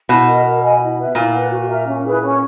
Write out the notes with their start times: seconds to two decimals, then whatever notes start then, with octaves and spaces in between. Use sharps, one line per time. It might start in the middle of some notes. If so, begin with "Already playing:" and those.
0.08 B2 E4
0.27 A#4 D#5
0.44 A#4
0.62 D#5 G#5 B5
0.79 E4
0.97 B4 E5
1.15 A#2 E4
1.32 B4 F#5
1.50 F#4
1.68 A#4 E5 A#5
1.85 C#4
2.03 E4 G#4 B4
2.21 C#4